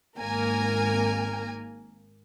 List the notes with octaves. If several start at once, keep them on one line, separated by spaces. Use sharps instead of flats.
G#1 A#3 A#4 G#5